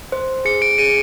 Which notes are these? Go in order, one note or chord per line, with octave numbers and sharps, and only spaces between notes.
C5
G#4 C#7
D7
G#4 D#7